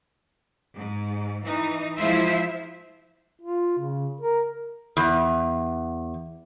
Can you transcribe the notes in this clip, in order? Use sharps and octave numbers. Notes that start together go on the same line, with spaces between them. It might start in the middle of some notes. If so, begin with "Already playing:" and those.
G#2
E3 D#4
F3 G#3 E4 F4 C5 E5
F4
C#3
A#4
E2